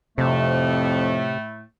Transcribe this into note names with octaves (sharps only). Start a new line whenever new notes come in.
F2 A2 C3 A3